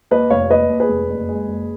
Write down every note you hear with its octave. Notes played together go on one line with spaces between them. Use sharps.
D#2 B4 D#5
F1 C#5 F5
D#2 B4 D#5
D#2
G#4 B4
F1
F#1
G#3
F#1